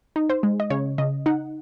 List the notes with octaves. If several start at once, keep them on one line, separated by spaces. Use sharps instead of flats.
D#4
C5
G#3
D#5
C#3 C#5
C#3 D#5
D#4 F#5